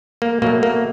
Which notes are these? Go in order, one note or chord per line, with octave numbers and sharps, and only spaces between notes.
A#3
B2 F#3 A3 A#3
A#3